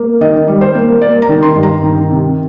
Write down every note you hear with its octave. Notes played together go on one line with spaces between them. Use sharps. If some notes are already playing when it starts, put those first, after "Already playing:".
Already playing: A#3
D#3 D#5
G3
C5
A#3
A#3 D5
A#5
D#3
C6
G2
A#5
D#3
C3